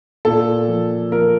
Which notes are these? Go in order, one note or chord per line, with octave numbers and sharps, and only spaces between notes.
A#2 A4
F3
F3 A#4